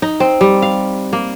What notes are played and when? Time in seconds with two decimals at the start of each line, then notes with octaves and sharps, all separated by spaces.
0.02 D#4
0.20 C4
0.41 G3
0.62 F5
1.13 A#3